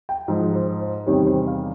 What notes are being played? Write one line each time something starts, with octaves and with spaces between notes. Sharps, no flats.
G5
G#2 F3
C5
C5
E2 C3 D#3 G3 C#5
C5
F5